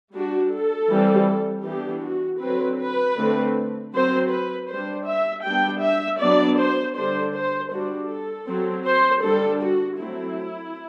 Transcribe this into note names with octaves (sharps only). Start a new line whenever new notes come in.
G3 D4 F#4
A4
E3 G3 C4
E3 B3 D4 G4
F#4
D3 F#3 C4 B4
B4
D3 A3 C4
F#3 C4 C5
B4
G3 D4 C5
E5
G3 B3 D4 G5
E5
F#3 B3 D4 D5
C5
D3 G3 D4 C5
C5
G3 D4 F#4
A4
F#3 C4
C5
D3 G3 D4 A4
F#4
F#3 A3 C4 E4